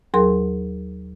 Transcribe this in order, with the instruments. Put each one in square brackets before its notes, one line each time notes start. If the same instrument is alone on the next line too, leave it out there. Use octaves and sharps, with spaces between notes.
[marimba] D#2 F#3 G#4 A#4 C6